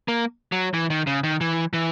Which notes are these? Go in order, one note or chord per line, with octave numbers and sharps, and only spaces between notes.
A#3
F#3
E3
D#3
C#3
D#3
E3
E3